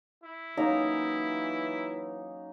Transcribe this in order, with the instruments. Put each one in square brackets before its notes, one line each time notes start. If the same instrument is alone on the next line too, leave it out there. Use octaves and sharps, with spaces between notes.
[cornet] E4
[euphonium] E3 [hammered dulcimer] F#3 A#3 [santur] C#4 D#4 A#5